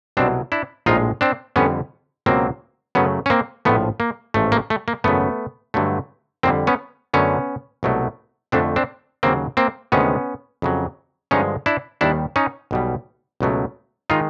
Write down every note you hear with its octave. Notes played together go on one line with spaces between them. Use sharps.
C2 B2 F#3 C4 D4
D4 E4
A#1 A2 F3 G#3 D#4 F4
C4 D4
F2 D3 G3 B3 C#4
C#2 B2 F#3 A#3 C4
F#2 C#3 F#3 A3 B3 C#4
C#4
A#3 C4
A#1 A2 F3 A3 B3
A#3
A1 G#2 F3 A3
A#3
A3
A#3
G#1 F#2 C#3 A3 B3
G2 D3 F#3 A3
F2 D3 G3 A#3 C4
B3 C#4
F#2 D3 F#3 A3 B3 C#4
C2 B2 F#3 A3
F2 D3 F3 A3 C4 D4
C4 D4
D#2 C#3 F#3 A#3 C4
A#3 C4
D2 C3 D#3 G#3 B3 C#4
F2 C#3 F#3
G2 D3 F3 G#3 C#4 D#4
D4 E4
D#2 D#3 G3 D4 E4
C#4 D#4
B1 B2 G3
C#2 B2 F#3 A3
D#3 G#3 D#4 F4